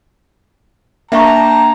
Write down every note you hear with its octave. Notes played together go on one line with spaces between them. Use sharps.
A#3 D4 E5 F5 G5 A5 A#5 C#6